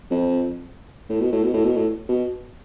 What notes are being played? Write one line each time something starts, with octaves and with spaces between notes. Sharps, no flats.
F2
A2
B2
A2
B2
A2
B2
A2
B2